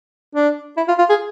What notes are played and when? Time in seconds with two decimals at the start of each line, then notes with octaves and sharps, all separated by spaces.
0.35 D4
0.77 E4
0.88 F4
0.99 F4
1.09 G#4